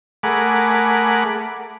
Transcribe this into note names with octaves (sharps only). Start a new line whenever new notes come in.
A3 G#4 A#4 F#5 B5 D6